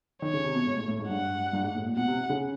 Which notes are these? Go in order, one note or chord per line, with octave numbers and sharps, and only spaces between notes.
D#3 C#5
C#3
C3
B2
G#2
A2
A2
G#2
G2 F#5
G2
G#2
A2
A#2
B2 F#5
C3
C#3